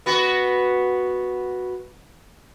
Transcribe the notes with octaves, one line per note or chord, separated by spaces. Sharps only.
B3 F#4